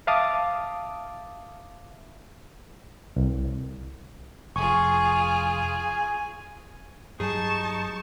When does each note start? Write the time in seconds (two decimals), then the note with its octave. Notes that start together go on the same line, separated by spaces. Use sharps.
0.07 E5 F5 A5 D6 D#6
3.16 C2
4.56 F1 F4 G#4 G#5 C#6
7.20 G2 F#3 G3 D#4 G#4 A5 C#6